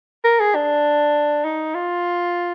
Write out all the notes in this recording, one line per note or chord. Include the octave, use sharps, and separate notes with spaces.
A#4
G#4
D4
D#4
F4